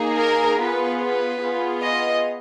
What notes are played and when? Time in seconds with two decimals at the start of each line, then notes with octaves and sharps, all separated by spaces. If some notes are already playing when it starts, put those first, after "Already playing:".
Already playing: A#3 D#4 G#4
0.19 A#4
0.60 B3 F4 G#4 B4
1.01 B4
1.43 B3 F4 G#4
1.83 D#5